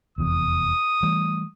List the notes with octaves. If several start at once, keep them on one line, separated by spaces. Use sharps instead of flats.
F1 E2 D#6
E3 G3 A3